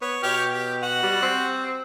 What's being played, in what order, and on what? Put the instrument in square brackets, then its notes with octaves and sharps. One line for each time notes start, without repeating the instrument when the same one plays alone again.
[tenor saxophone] B3 [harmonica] C#5
[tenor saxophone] B2 [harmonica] G4 C#5 F6
[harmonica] G4
F#4 F#5
[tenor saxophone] G3
C4